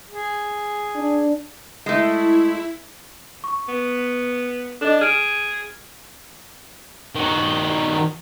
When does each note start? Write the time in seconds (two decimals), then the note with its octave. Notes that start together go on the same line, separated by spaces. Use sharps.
0.11 G#4
0.96 D4
1.86 G#3 A3 E4
3.44 C#6
3.69 B3
4.81 D4 A4 D#5
5.01 G#4 F6 D7 E7
7.15 D#3 F#4